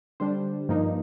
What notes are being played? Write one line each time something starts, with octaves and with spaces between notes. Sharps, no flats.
D3 G3 D4 C5
G2 F3 A#3 D#4